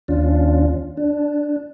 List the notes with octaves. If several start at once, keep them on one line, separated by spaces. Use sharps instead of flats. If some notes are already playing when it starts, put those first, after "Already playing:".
D#2 C#4 D4 F4
D4